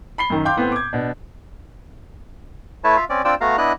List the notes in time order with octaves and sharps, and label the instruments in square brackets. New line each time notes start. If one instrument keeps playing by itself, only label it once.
[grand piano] B5 C7 G7
F#2 D#3
F5 G5 C6 D6 G6
A2 B3 C4
D6 G#6
B2 D4
[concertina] A3 E4 B4 C#5 A5
F4 E5 F5
C4 C#4 D5
C4 D4 F4 D5 G5 E6
A3 B3 F#4 F5 A#5
B3 D4 E4 D#5 F#6